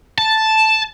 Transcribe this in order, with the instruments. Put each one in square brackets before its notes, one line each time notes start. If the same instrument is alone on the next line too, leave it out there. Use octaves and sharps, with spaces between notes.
[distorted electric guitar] A5